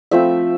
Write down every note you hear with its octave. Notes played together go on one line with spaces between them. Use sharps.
F3 A3 C4 E5